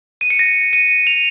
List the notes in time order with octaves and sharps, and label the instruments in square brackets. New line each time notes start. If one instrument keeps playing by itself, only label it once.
[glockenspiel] D#7
C#7
A#6
D#7
F7